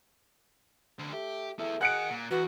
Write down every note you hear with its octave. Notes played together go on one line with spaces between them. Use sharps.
D2 D3
A3 G4
A3 E4 G#4
G#4 A#4 D#5 F#5 F#6 C#7 D7
A#2
E2 B3 F#4